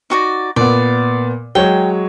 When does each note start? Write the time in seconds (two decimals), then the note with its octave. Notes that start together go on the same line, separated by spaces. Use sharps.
0.10 D#4 F#4 D5
0.56 A#2 B3 D5
1.55 F#3 G#3 C#5 G5